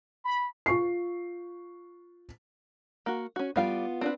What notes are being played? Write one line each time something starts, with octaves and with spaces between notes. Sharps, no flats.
B5
F4 C#6 C7
A#3 F#4
C#4 F#4
G3 B3 F4 F5 G5
C4 D4 B4